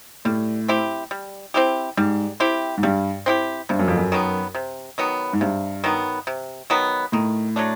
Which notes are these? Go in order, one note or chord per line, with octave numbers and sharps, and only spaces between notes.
A2 G3
C4 E4 G4
G3
C4 E4 G4
G#2 G3
C4 E4 G4
G#2
G2 G3
C4 E4 G4
G2 C3
F#2
F2
F#2
D#3 F#3 B3
C3
D#3 F#3 B3
G#2
G2 C3
D#3 F#3 B3
C3
D#3 F#3 B3
A2 D#3
F#3 A3 D4